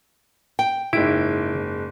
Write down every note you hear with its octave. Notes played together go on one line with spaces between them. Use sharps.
G5
F#1 G#2 E4 D7